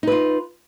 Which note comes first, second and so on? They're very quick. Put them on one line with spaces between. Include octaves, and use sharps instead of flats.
D#4 B4 F4